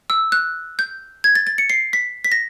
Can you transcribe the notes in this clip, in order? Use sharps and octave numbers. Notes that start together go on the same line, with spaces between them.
E6
F#6
G6
G#6
A6
A6
C#7
C7
B6
B6
A#6